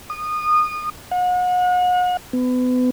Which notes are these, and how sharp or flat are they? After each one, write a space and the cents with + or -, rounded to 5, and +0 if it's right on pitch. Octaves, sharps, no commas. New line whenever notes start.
D#6 -25
F#5 -40
B3 +30